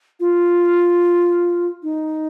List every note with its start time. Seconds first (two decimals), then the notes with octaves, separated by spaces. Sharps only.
0.20 F4
1.83 D#4